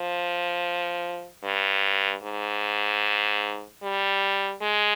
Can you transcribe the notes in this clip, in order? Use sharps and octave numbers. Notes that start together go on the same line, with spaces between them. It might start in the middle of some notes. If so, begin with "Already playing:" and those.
Already playing: F3
G2
G#2
G3
G#3